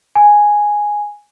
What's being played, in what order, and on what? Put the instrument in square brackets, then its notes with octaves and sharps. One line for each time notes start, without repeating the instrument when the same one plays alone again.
[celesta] G#5